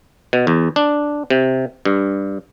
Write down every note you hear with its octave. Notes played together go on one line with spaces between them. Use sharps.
B2
E2
D4
C3
G2